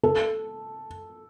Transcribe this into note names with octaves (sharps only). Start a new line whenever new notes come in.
A4